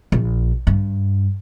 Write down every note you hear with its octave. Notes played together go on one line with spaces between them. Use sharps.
A#1
G2